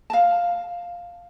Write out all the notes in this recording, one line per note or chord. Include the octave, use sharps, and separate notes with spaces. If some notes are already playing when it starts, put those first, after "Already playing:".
F5 A5